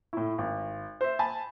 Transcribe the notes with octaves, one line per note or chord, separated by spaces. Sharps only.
A2 E4
G#1
C5 E5
G#5 A5 B5